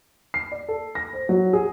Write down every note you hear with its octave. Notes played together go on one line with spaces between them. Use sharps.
C7
D5
A4
A#6
C5
F#3
G#4